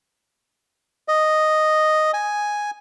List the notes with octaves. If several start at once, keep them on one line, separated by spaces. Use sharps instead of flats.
D#5
G#5